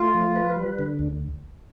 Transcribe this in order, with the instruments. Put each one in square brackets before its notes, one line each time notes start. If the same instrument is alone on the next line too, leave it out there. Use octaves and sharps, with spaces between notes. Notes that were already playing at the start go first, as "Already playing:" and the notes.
Already playing: [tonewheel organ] A3 [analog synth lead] F4
[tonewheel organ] F3
B4
G3
D3
D2